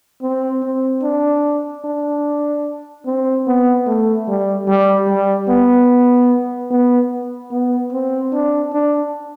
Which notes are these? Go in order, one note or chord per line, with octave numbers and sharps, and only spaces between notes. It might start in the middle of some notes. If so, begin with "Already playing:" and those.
C4
C4
D4
D4
C4
B3
A3
G3
G3
G3
B3
B3
B3
C4
D4
D4